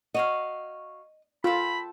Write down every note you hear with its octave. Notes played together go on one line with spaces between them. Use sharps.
F#4 C#5 D#5 F5
F4 A4 G5 B5